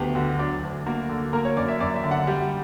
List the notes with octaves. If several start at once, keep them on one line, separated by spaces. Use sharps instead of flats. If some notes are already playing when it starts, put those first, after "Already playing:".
Already playing: D2 F#3 B3 G4
D3 F#4
F#3 D4
D2
A#3 F#4
D3
A#3 A#4
C#5
F#2 D5
E5
F#2 D5
E5
D3
F#5
G3